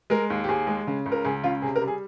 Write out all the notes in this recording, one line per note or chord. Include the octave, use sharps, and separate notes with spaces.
G#3 A#4
D#2
G4
D#2 G#4
G#3
C#3
C#2
A#4
C#2 G#4
C#3 F4
C3 G#4
A#4
G3
G#4